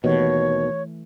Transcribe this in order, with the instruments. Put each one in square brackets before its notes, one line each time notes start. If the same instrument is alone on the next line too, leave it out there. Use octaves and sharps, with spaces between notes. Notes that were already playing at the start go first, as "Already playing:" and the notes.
[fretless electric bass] D#2 B2 [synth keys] E3 A3 [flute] C#5